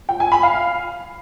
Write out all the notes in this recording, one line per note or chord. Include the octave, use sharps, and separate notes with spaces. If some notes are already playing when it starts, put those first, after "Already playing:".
G5
G#5
B5
F5